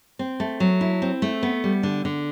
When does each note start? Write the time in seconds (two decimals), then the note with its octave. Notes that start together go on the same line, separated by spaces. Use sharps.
0.19 C4
0.40 A3
0.60 F#3
0.81 E4
1.02 C4
1.22 A3
1.43 B3
1.64 G3
1.83 D3
2.05 D3